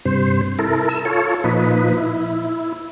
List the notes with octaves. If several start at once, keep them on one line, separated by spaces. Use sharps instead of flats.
G2 C3 C5
E4 A4 A#4
E6
F4 A4 C#5
A#2 F3 D#4 B4
E4